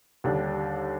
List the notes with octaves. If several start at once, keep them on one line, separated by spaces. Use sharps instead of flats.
D#2 D3 G3 D4